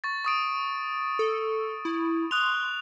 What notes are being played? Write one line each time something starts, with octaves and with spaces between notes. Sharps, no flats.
C#6 A6
C#6 D#6 D7
A4
E4
C6 D#6 F#6 F7